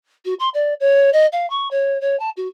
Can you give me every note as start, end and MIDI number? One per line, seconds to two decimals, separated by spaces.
0.25 0.34 66
0.39 0.49 84
0.54 0.73 74
0.80 1.10 73
1.13 1.26 75
1.32 1.48 77
1.50 1.68 85
1.71 2.00 73
2.01 2.17 73
2.19 2.30 81
2.36 2.47 66